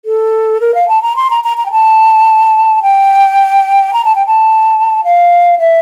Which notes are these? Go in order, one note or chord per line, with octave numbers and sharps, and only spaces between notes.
A4
A#4
F5
A5
A#5
C6
A#5
A#5
A#5
G5
A5
G5
A#5
A5
G5
A5
F5
E5